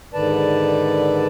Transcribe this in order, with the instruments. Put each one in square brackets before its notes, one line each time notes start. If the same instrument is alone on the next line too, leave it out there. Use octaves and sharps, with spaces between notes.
[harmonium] G#2 D3 D#3 B4 D5 A5